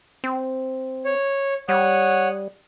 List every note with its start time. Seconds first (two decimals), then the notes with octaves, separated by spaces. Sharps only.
0.24 C4
1.05 C#5
1.69 G3 C#5 F#5 D#6